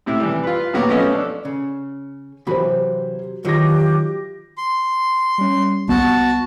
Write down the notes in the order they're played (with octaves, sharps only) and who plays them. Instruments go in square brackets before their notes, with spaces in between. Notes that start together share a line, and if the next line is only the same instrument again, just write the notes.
[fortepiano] A2 C3 E4
E3 G3
F4 B4
A#2 F#3 B3 F#4 G4
F3 A3 B3 C#4 D#5
D4 A4
[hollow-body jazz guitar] C#3
[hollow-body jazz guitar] C3 E3 B5 [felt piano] F#3 G4 C5
[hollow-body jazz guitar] D#3 E3 F#3 [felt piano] F4 A#6 [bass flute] G4
[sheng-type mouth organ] C6
[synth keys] G3 C#4
[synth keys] C2 [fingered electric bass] B3 [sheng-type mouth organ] F#4 A5